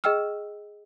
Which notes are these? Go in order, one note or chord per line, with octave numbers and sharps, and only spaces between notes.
G#4 D#5 G5 E6 F6